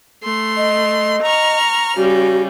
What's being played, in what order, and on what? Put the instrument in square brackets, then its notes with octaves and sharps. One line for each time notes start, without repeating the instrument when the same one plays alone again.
[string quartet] A3 C6
[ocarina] D#5
[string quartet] A#5 C#6 F6
[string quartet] C#3 G3 [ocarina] F#4